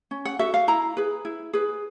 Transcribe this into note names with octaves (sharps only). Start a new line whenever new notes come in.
C#4
F#5
F#4 A4 E5
F5
E4 A#5
G#4 B4
E4
G#4 B4